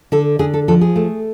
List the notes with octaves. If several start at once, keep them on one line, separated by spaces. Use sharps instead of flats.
D3 A4
D3 G#4
A4
F3 A4
G#4
A3